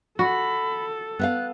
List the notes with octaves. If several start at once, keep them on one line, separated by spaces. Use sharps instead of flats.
F#4 A4 B5
B3 E5 F5 F#6